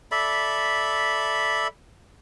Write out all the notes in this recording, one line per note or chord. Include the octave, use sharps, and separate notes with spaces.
A4 D5 E5 B5